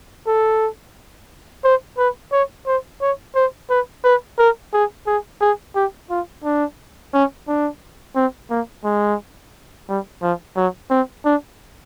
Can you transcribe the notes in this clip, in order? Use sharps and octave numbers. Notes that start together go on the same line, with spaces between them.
A4
C5
B4
C#5
C5
C#5
C5
B4
B4
A#4
G#4
G#4
G#4
G4
F4
D4
C#4
D4
C4
A#3
G#3
G3
F3
F#3
C4
D4